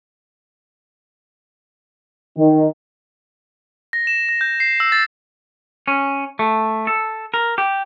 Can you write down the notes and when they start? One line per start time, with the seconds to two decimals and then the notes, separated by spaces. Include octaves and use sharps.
2.36 D#3
3.93 A#6
4.07 E7
4.29 A#6
4.41 G6
4.60 C7
4.80 E6
4.92 A6
5.88 C#4
6.39 A3
6.87 A4
7.34 A#4
7.58 G4